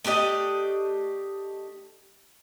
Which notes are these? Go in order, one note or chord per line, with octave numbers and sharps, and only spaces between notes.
A3 D4 G4 D#5